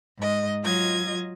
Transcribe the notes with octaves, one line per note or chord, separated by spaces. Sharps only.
G#2 D#5
F#3 F4 D#5 G#6